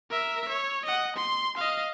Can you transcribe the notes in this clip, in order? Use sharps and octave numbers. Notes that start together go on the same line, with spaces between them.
A#4 E5
C#5
D#5 F#5
C6
D#5 F5